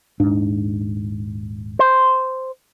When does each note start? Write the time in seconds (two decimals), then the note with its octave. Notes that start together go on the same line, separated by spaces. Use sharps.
0.20 D#1 G#2 D4
1.79 C5